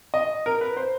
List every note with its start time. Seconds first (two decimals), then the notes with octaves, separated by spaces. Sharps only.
0.14 D#5
0.46 A#4
0.61 B4
0.77 C5